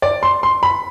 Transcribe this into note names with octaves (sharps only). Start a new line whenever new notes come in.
D5
C6
C6
B5